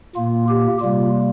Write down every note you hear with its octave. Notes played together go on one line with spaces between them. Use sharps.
A#2 A#3 F4
G4
C3 G3 A#3 F4